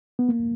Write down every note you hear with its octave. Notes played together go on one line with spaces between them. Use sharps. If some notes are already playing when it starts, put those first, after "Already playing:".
B3
A#3